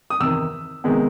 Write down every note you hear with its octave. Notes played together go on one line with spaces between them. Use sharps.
D#6
E2 C3 D#3 E6
C3 D#3 G#3 B3